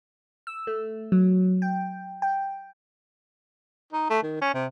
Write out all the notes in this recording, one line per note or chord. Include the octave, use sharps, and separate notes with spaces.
E6
A3
F#3
G5
G5
D#4
A3
D#3
C#4
C3